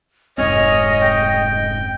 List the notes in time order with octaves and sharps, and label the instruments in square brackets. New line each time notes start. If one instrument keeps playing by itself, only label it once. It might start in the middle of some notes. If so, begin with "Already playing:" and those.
[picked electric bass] F1 G#2 C4 [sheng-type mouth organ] C#5 G#5 F6 [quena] D#5
[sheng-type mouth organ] G5